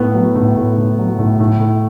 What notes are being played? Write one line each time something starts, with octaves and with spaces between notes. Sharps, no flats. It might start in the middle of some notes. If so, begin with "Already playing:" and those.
Already playing: A2 B3
F#3
A2
A2
A2
F#3
A2
A2
A2